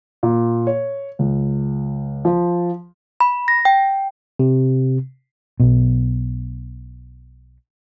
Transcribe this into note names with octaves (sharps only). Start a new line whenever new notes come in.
A#2
C#5
C#2
F3
B5
A#6
G5
C3
B1 B2